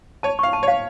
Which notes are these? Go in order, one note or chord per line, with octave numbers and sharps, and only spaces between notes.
C#5 A5
F5 C#6
A5
C#5
F5